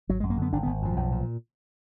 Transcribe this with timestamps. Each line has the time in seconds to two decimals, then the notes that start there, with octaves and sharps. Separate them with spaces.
0.09 G#1 F#3
0.20 G#3
0.23 F#2
0.30 A#3
0.38 D3 B3
0.53 G#1 D4
0.63 B3
0.67 G#1
0.82 F#2 F3
0.97 B1
1.11 A#2